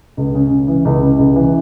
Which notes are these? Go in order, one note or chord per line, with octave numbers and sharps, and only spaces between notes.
C#2
C#3
C#2
E3
C#2
C#3
C#2
E3